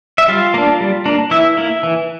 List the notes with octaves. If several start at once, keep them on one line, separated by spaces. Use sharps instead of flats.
E5
G3 F4 F5
A#3 D4
G3
A#3 D4
E3 E4 E5
A#3 E4
E3